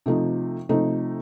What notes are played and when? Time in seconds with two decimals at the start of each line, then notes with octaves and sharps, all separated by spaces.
0.06 C3 F3 A3 D#4
0.69 C3 F3 A3 D#4